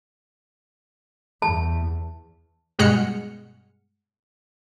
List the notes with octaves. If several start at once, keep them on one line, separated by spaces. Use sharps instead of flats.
E2 A5
G2 B2 G#3 F#5 F6 C#7